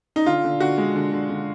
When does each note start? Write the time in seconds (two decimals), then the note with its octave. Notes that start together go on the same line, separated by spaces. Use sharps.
0.16 D#4
0.26 D3 F4
0.44 D3
0.60 D3 F#4
0.78 G#3
0.95 D3
1.13 D3
1.30 D3